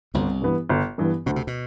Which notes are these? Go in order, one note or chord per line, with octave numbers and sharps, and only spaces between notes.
G1 C2 C3
G2 E3 B3
G1
G2 E3 B3
D2 B2
C3
B2